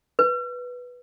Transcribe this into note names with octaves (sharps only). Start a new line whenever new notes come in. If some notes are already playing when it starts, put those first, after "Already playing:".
B4